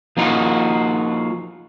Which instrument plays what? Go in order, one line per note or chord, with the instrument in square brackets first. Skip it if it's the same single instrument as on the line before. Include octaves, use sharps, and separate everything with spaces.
[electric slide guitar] F3 A#3 D#4 F4 F#4